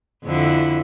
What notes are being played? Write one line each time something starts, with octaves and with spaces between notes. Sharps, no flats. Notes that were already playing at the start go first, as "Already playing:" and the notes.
F2 D3 E4